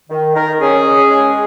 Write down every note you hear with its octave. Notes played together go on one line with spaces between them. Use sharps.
D#3
D#3 A#4
C#4 G#4
C#4
G#3